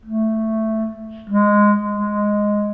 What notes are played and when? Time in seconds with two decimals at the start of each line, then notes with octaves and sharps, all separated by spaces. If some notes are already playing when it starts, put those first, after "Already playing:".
0.05 A3
1.29 G#3
1.91 G#3